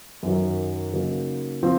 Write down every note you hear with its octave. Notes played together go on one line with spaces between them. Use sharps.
F#2 D#3 F#3
C#3 F#3 A#3 D#4
F3 C4 F4